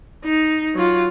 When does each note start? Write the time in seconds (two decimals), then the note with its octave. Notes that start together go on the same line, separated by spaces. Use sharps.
0.25 D#4
0.75 F#3 F4